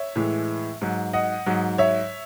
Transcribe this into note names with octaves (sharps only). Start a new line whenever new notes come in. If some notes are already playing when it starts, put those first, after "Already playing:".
Already playing: C#5 E5
A2 E3 G#3
G#2 F#3
D#5 F#5
G#2 F#3
C#5 E5